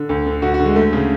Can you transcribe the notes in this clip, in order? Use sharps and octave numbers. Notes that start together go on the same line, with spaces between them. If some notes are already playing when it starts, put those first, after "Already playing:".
Already playing: D3
D2
D3
D2 F#4
F#4
D3
G#3
D2 A3
C#3